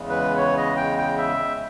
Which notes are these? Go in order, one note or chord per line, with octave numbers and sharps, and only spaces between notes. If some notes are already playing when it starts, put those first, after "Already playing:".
Already playing: E2 C#3 G#3
B4
C#5
D#5
G5
G5
E5